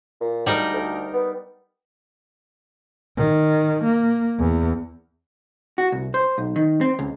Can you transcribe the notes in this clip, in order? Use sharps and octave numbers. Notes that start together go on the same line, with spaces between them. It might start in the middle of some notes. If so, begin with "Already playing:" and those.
A#2
D2 G3 D#4 A#4
D2
B3
D#3
A#3
E2
F#4
C2
C5
B1
D#3
C4
C#2